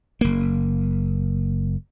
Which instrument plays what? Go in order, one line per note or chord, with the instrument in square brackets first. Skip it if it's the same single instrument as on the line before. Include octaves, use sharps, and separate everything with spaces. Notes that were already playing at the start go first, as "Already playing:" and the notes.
[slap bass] F#1 A#3